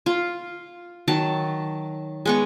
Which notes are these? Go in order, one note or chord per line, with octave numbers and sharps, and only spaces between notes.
F4
D#3 F#3 A5
G#3 B3 C#6